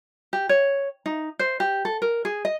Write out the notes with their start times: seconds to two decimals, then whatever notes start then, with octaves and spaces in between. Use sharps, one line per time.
0.33 G4
0.49 C#5
1.06 D#4
1.39 C5
1.60 G4
1.85 A4
2.02 A#4
2.25 G#4
2.45 D#5